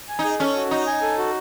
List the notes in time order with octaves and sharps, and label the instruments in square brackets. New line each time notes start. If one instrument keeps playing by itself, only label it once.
[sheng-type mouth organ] G#5
[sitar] D#4
[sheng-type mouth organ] G#4
[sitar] C#4 [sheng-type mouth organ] A4
[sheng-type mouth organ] F#4
[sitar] D#4 [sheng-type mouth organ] D#5
[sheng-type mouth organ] G#5
A4
F#4